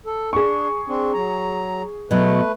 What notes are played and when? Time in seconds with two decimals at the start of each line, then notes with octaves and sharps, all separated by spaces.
0.06 A4
0.33 D4 G#4 C#6
0.88 C4 D4
1.14 F#3 A#5
2.11 B2 F#3 A3 B4